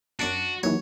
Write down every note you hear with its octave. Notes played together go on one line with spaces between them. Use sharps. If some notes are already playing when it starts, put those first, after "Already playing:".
F#2 D4 F#4 D5 D7
D#2 E3 F#3 C#5